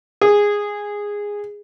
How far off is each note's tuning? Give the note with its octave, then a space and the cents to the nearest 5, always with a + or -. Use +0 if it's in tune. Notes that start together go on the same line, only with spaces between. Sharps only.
G#4 -10